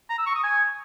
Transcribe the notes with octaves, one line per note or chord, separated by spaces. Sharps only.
A#5
E6
C#6
D#6
G#5